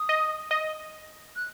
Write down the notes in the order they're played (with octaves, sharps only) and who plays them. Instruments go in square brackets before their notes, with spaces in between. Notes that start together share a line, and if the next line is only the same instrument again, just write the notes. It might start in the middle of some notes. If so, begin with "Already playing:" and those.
Already playing: [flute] D#6
[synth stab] D#5
D#5
[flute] F#6